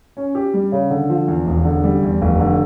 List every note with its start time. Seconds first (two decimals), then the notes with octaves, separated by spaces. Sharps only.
0.17 C#4
0.35 G4
0.54 G3
0.72 C#3
0.90 D3
1.10 F3
1.28 E2
1.47 E1
1.65 D3
1.84 G3
2.03 E2
2.21 F1
2.40 D3